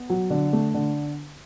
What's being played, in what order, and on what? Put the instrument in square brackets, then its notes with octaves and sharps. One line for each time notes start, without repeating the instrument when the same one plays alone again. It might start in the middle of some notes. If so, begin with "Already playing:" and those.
Already playing: [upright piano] B3
F#3
D3
A3
D3